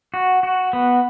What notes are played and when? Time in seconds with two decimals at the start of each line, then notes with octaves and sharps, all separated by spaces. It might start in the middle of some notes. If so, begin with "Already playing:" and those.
0.14 F#4
0.43 F#4
0.73 B3